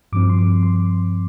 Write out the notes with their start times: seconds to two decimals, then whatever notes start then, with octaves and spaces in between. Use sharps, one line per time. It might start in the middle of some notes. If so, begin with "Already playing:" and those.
0.12 G2 F3 C4 D6
0.30 C6
0.39 D6
0.63 C6